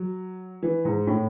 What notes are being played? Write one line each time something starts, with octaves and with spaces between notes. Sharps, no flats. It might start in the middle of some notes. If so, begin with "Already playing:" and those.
Already playing: F#3
E3
G#2
A2